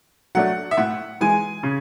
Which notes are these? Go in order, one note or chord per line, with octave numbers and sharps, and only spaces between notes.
F#3 A3 D4 F#5
E5
A2 F#5
E3 G#3 G#5
C#3